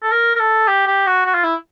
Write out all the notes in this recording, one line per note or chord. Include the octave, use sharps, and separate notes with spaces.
A4
A#4
A#4
A4
G4
G4
F#4
F#4
F4
E4